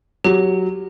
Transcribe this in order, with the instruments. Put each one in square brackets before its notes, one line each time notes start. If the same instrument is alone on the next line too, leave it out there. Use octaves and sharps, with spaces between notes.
[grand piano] F#3 [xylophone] G4